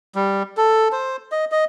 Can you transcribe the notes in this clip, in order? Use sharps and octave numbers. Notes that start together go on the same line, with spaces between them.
G3
A4
C5
D#5
D#5